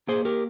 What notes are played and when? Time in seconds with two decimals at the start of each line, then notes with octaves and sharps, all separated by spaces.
0.08 A#3 G#4 C5
0.25 G4 A#4